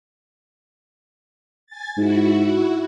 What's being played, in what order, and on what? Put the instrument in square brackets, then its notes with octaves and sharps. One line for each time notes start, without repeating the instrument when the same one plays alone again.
[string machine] G#5 A6
[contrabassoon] G#2 [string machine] E4 F#4